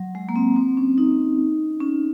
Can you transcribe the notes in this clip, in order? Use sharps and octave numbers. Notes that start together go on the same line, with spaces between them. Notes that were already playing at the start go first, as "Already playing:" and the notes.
Already playing: F#3
G#3
A#3
C4
C4
C#4
D#4
C#4